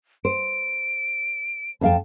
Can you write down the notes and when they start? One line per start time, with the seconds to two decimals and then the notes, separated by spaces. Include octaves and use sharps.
0.25 C5 D7
1.81 F2 F5 G5 A5